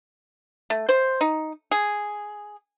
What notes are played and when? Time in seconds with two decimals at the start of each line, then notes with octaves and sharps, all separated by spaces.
0.70 A3
0.89 C5
1.21 D#4
1.71 G#4